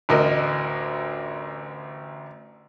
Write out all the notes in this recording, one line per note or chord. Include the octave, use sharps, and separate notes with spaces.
A1 D2 A#4 D#5